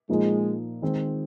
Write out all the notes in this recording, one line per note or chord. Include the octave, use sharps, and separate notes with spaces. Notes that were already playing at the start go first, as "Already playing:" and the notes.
A#2 F3 G#3 A#3 D#4
D#3 G#3 C4